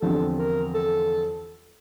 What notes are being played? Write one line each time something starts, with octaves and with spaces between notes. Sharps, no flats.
E2 D3 F3 C4 G4 A4
A#4
A4